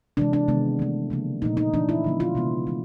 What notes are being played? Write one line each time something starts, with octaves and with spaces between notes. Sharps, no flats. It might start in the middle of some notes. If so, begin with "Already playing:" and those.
C3 E3 G#3 D4
D4
C3 D#3 G#3 B3
E3 A3
C#3 F3 A#3
A#2 F3 A3 D#4
D#4
E3 A3 D4
E4
D3 F3 G#3 B3
F4
C3 E3 G#3 B3
E3 A3